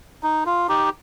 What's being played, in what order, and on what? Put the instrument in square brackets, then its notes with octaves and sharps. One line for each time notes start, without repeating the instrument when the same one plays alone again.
[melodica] D#4
F4
D#4 G4